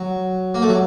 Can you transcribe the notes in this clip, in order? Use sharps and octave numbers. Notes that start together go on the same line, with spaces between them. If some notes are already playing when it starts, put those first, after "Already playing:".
Already playing: F#3
A#3
A3
F#3